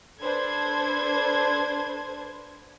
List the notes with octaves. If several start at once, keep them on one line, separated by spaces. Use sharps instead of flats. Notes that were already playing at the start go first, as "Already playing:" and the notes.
D4 A4 B4 C5 G#6